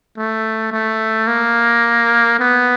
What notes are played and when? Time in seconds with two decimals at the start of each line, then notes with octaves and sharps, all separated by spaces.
0.17 A3
0.72 A3
1.27 A#3
2.39 B3